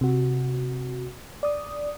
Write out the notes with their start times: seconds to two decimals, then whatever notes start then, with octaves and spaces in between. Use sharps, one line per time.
0.01 C3 F#4
1.43 D5 D#6